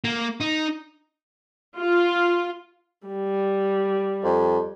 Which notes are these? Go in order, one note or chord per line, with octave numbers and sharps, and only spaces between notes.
A#3
D#4
F4
G3
F2